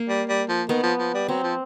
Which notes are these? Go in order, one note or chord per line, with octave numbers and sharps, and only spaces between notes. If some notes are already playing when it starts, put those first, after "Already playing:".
Already playing: A#3
G3
G3
F3
D#3 B3
F3
F3
G3
F#3 C4
F3